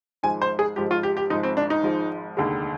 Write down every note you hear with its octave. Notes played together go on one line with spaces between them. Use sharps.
G#1 G#2 F3 G#3 G#5
C5
G#4
G#1 G#2 F3 G#3 G4
F4
G4
G4
G#1 G#2 F3 G#3 D#4
C4
D4
D#4
G#1 G#2 F3 G#3
F1 D#2 D3 G#3